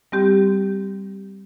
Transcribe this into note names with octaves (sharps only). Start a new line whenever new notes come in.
G3 C4 G4 G6